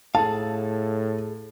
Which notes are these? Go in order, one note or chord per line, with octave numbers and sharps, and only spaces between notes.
A2 G#4 A4 F5 A5